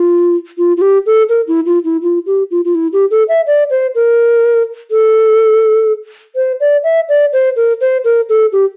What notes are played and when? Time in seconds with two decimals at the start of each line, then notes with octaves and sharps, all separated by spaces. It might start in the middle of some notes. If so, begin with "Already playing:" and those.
Already playing: F4
0.58 F4
0.77 F4
0.81 G4
1.06 A4
1.29 A#4
1.48 E4
1.66 F4
1.85 E4
2.02 F4
2.26 G4
2.51 F4
2.65 F4
2.75 E4
2.93 G4
3.11 A4
3.29 E5
3.47 D5
3.70 C5
3.95 A#4
4.91 A4
6.36 C5
6.60 D5
6.84 E5
7.09 D5
7.33 C5
7.56 A#4
7.81 C5
8.04 A#4
8.29 A4
8.52 G4